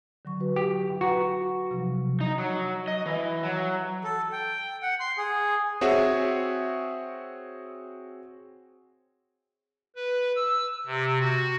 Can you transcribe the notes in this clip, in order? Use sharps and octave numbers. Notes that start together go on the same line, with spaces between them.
D3 F#3 C#6
F#4 B4
G4
F#4 B4 A#5
C3 F3 F#3
D#4
F#3
D#5
E3
F#3
A4
G5
F#5
C6
G#4
C4 F#4 G#4 C#5 E5
B4
E6
C3
F#4